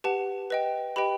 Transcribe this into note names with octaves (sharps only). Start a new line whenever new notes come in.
G4 B4 F#5 A5
B4 D#5 G5
G4 B4 D#5 G5 B5